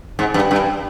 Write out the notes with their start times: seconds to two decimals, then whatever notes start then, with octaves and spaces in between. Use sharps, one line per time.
0.19 G#2
0.34 G2
0.51 G2